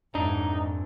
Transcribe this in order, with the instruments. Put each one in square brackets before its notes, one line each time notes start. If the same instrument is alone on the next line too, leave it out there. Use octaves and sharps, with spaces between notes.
[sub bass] F2 [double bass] G#2 [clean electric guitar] E3 D4 [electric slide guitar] D#4